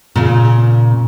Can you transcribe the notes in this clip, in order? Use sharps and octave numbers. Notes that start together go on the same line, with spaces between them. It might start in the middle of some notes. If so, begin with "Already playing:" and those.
A#2 C#3